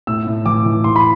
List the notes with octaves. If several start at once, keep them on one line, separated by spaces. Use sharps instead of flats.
A2 E6
A2
E3 D6
E3
E3 C6
B5